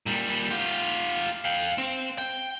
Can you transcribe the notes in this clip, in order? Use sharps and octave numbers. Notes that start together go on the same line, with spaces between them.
A#2 G3
F4 G4
F5 G5
C4
G5